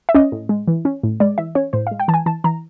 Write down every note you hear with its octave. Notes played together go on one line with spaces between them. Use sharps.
E5
C#4 D#5
A2
G#3
E3
C#4
A2
G#3 D5
E3 E5
C#4 C#5
A2 C5
F5
G#3
G5
E3 A5
G#5
E3 A5
E3 A#5